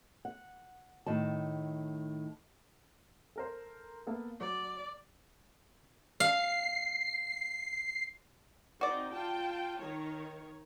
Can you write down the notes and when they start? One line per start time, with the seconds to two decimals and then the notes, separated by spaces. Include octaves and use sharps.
0.25 F#5
1.06 A2 D#3 A5
3.36 A4 A#4 C5
4.07 A#3 B3 A4
4.41 F#3 D5
6.20 F5 C7
8.81 C4 D#4 F#4 D5
9.12 F4 G5 A5
9.80 D#3 C#5